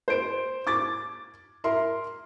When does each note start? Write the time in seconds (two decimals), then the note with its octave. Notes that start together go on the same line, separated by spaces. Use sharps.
0.08 C5 D7
0.67 D6 A6
1.64 A#4 E5 C6